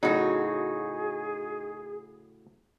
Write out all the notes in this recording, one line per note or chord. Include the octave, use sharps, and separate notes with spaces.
A2 C#3 F#3 D#4 F#4 G#4